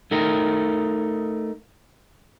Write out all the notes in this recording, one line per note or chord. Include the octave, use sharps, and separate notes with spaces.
A3 D#4 A#4